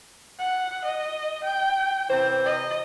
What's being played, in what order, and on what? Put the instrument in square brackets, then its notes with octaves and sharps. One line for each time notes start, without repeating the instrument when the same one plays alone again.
[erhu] F#5
D#5
G5
[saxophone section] C3 E3 C5
[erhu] D#5